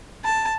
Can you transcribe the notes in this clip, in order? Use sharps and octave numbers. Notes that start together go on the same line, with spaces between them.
A5